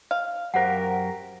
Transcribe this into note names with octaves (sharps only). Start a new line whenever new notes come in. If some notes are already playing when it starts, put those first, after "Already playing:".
F5
F#2 G4 A#4 C5 F#5